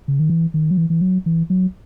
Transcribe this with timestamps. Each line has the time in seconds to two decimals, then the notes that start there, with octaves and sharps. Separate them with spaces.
0.08 C#3
0.20 D#3
0.30 E3
0.54 D#3
0.71 F#3
0.77 E3
0.90 E3
1.01 F#3
1.26 E3
1.50 F#3